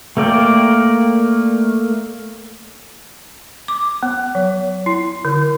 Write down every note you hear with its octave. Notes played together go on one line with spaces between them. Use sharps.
A3 A#3 A#4 D5 G5
D6
B3
F#3
E4
D3